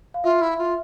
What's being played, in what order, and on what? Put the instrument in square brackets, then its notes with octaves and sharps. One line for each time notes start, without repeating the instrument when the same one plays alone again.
[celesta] F5
[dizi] F4 [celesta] E5
[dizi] E4
F4